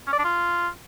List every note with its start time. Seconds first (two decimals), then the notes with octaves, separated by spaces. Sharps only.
0.07 C#4
0.13 D5
0.18 D4
0.24 F4